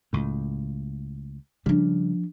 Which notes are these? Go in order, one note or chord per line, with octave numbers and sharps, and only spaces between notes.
C#2 A2
C#3 F3 G3 D4